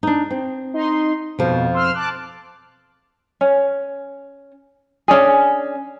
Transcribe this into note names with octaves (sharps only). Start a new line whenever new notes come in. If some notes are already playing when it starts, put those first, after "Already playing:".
D4 D#4
C4
D#4 C6
F2 B2 F3
C6 E6 F6
A5 D6 F#6
C#4
C#4 D4 G#4